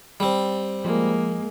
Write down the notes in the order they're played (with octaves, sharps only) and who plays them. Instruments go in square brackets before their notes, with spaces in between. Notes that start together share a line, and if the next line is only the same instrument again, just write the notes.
[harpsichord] G3 C4
[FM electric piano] F3 [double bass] G#3 [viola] A#3